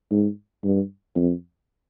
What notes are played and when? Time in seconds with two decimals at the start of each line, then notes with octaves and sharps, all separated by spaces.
0.11 G#2
0.64 G2
1.16 F2